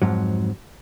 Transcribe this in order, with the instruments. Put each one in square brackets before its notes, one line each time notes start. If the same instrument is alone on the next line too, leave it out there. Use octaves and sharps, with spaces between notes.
[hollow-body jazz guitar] F2 G#2 F#3